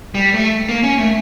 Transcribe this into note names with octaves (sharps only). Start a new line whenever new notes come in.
G3
A3
A#3
C#4
A3